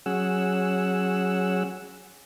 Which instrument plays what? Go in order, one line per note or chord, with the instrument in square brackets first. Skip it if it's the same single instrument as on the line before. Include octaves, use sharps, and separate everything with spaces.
[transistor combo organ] F#3 C#4 G#4 F#5 E6